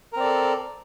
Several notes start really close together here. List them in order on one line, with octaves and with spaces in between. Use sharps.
A#4 C4 D5 A4